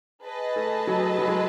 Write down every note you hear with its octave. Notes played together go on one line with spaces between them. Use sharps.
G#4 B4 D#5 A5
A3
F#3
F#3
G#3